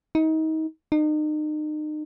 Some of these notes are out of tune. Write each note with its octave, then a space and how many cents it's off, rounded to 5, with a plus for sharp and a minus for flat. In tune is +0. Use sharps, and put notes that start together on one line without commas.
D#4 +30
D#4 -35